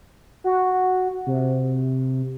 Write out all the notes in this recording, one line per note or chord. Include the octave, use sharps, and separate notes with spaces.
F#4
C3